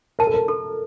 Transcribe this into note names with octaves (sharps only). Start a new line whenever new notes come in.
A#4 A5
A4
A#4
A4